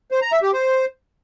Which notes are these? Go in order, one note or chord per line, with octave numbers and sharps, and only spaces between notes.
C5
A#5
E5
G4
C5